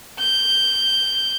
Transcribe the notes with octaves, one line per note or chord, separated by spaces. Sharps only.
G6